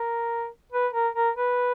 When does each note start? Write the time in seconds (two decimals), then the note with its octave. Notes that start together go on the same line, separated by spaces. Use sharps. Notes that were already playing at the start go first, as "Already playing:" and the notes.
Already playing: A#4
0.73 B4
0.94 A#4
1.15 A#4
1.36 B4